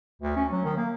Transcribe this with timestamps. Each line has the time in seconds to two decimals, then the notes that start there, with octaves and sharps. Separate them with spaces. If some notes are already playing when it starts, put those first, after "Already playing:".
0.22 D2
0.36 C#4
0.52 F#3
0.65 D#3
0.77 A#3